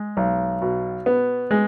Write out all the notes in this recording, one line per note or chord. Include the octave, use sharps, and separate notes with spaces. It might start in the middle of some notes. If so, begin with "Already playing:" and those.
Already playing: G#3
B1
B2
B3
G#3